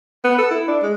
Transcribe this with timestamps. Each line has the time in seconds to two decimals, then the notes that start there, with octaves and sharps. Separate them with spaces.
0.24 B3
0.38 A4
0.51 E4
0.68 D4
0.82 G#3